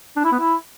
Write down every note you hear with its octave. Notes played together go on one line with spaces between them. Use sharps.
D4
E4
B3
E4